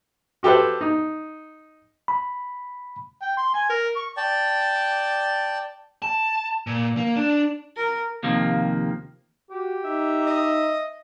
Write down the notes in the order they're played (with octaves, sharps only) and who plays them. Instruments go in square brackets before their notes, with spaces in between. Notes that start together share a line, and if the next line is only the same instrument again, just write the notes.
[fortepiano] F#4 G4 A4 B4 C5
D#4
[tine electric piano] B5
[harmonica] G5
C6
G#5
A#4
C#6
[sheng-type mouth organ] D5 G5 A5
[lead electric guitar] A5
A#2
A#3
D4
[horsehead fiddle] A#4
[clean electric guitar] D#2 C3 F3 A#3
[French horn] F#4 [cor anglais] G4
[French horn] D#4 [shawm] E5
[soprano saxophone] D#5